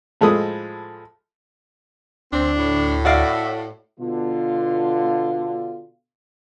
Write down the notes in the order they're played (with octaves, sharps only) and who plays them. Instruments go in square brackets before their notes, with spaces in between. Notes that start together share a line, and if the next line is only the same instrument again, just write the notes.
[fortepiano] A2 F3 G#3 A4 B5 D#6
[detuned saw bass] D2 [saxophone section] C4 [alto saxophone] D4
[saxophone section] A2
[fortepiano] F#4 D5 F5 [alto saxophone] E5
[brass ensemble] B2 D3 F4